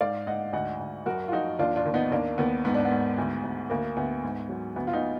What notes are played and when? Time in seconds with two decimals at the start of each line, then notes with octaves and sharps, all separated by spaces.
0.01 G#2 D5 F5
0.27 G#2 D#5 F#5
0.53 D2 D#5 F#5
0.80 D2
1.06 F#2 F#4 A#4
1.28 F4
1.32 F3 D#4 F#4
1.59 D#2 D4 F4
1.76 D4 F4
1.85 D#2
1.94 B3 D#4
2.11 D#2 A#3 D4
2.38 D#2 B3
2.65 G#2 B3
2.74 D4
2.85 B3
2.91 G#2
3.18 D2
3.43 D2
3.70 D2 A#3
3.97 D2 B3
4.23 G#2
4.49 F#3
4.76 D2 B3
4.87 F4
4.93 B3 D#4